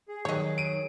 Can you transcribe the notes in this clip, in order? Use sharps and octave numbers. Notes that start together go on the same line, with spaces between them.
G#4
D#3 F#3 C#5 D#5
D7 D#7